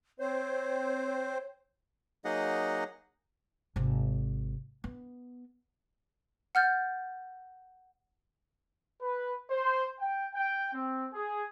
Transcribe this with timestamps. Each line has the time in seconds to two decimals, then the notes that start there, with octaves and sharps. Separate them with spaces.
0.20 C4 C5 C#5
2.25 F#3 A#3 D#4 G#4 D#5 F#5
3.76 G#1 C3
4.84 B3
6.55 F#5 F6 G6 A6
9.02 B4
9.50 C5
9.99 G5
10.35 G5
10.74 C4
11.13 G#4